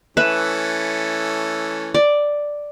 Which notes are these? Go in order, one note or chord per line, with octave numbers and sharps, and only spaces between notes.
E3 A3 C#4 B4 E5
D5